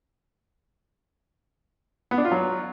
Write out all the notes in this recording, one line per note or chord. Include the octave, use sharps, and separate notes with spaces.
B3
D4
F4
F#3